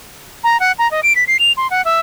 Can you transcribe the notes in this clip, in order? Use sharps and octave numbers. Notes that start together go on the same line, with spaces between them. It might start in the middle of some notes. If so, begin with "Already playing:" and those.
A#5
F#5
A#5
D#5
D7
B6
C7
F7
C6
F#5
E5